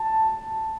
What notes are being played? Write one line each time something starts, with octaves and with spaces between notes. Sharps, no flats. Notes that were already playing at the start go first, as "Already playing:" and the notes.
Already playing: A5